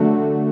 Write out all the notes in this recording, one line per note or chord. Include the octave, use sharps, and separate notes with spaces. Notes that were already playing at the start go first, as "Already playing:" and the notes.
Already playing: D3 F#3 A3 D4 F#4